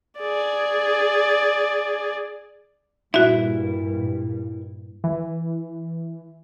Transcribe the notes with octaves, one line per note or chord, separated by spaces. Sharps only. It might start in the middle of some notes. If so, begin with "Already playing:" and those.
G#4 D5
G2 A#2 G3 E4 F#4 E5
E3